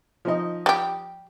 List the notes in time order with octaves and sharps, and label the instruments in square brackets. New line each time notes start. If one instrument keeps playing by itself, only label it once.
[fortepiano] F3 D#4 D#5
[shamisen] G3 G4